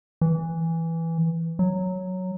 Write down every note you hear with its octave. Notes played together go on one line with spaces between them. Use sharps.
E3
F#3